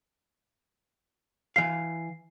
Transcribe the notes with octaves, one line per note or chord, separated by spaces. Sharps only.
E3 F5 C7